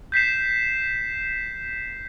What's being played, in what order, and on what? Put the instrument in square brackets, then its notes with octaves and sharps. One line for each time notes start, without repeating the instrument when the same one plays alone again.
[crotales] G6 B6 C7 E7